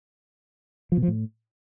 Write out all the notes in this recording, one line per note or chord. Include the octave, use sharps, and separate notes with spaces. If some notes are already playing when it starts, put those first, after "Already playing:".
F3
B2
F3
A2